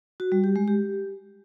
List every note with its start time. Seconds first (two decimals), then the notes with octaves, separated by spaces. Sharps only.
0.20 F#4
0.32 G3
0.44 G4
0.56 G#3
0.68 G4